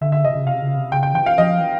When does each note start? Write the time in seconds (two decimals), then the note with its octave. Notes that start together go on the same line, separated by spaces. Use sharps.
0.01 D3 E5
0.12 E5
0.24 C#3 D#5
0.35 C#3
0.46 C3 F5
0.62 C#3
0.77 C3
0.92 C#3 G5
1.03 G5
1.14 E3 G5
1.26 F5
1.38 F3 D#5
1.60 E3